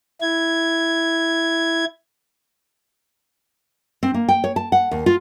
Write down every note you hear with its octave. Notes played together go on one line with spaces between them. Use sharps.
E4 G#6
C4
A#3
G5
C#5
A5
F#5
D#2
F4